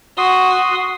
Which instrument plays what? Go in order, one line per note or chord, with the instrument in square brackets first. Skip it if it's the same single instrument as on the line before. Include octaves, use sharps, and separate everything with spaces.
[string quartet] F#4 [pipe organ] C6 D#6